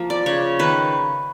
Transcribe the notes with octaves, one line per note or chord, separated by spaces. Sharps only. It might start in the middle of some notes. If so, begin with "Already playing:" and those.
Already playing: F3 A#3
D5
C#3 C#5
D#3 B4